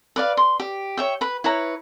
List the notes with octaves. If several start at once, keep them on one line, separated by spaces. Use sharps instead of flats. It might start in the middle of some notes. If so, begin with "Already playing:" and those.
B4 D5 F5
C6
G4
C#5 E5 G5
B4 B5
E4 B4 C#5 A#5